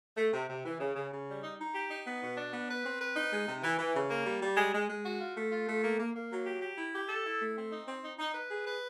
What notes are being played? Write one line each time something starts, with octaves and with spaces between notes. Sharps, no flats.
A3
C3
C3
E3
C#3
C#3
C#3
G3
D#4
D#4
G4
D#4
B3
B2
D4
B3
B4
C4
B4
D#4
G#3
C3
E3
E3
C#3
A#3
G3
G3
G#3
G#3
G#3
F#4
F4
A3
F4
A3
A#3
A#3
A#3
F#3
G4
G4
E4
G4
A4
E4
A3
C4
D#4
C4
D#4
D#4
B4
G#4
B4